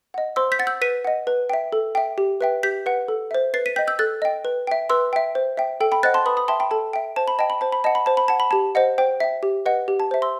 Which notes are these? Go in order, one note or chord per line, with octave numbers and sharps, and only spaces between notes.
D#5 F#5
C5 C6 E6
G6 B6
F#5 A6
E6 G6
B4 B6 D#7
D#5 F#5
B4
E5 G5
A4
E5 G5
G4
B4 E5 G5
G4 G6 B6
B4 F#5
A4
C5 E5
B4 A6 C7
B6 D#7
D#5 G5 G6 B6
E6 G6
A4 F#6 A6
D#5 G5
B4
E5 G5
B4 C6 E6
E5 G5
C5
E5 G5
A4 G5
G5 B5
C5 D#5 F#5 F#6 A6
A5 C6
B4 B5 D#6
B5 D#6
E5 G5 A5 C6
G5 B5
A4 A5
E5 G5
C5 A5
B5
D#5 G5 A5
B5
C5 A5
B5
D#5 F#5 A5
B5
C5 A5
B5
F#5 A5
B5
G4 A5
C5 D#5 F#5
C5 G5
E5 G5
G4
B4 D#5 F#5
G4
A5
C5 E5
C6 E6